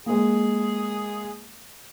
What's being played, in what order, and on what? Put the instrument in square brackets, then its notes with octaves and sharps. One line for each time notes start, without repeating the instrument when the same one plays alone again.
[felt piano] G#3 A#3 [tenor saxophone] G#4